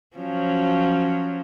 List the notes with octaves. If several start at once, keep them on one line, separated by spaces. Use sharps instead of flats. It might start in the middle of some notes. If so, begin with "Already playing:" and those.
F3 F#3 C#4